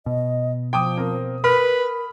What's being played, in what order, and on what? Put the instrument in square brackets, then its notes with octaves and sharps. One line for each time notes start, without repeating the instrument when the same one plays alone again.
[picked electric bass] B2 [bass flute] D#5
[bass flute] F3 [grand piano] G5 D6 D#6
[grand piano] C4 A#4
[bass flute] A#4 [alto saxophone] B4 [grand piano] B5 F6